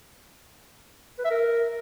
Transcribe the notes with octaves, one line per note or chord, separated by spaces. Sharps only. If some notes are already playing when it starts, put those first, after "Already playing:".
B4
E5
A#4